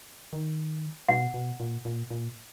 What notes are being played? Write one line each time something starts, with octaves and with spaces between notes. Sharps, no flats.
D#3
B2 F#5
B2
A#2
A#2
A#2